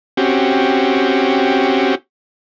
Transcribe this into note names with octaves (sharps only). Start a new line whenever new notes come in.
C4 C#4 F#4 G4